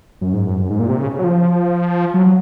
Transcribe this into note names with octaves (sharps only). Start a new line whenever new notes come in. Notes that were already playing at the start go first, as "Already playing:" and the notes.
F#2
G#2
F#2
F#2
G#2
A#2
C3
C#3
C#3
F#3
F3
F#3
F#3